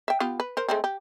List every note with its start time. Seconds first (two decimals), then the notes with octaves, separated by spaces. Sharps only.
0.08 E5 G5
0.20 B3 F4 G4
0.40 B4
0.57 A#4 C5
0.69 G#3 A3 C4
0.84 G4